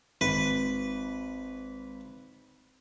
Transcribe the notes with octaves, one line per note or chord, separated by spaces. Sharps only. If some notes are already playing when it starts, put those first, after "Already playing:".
G#1 B4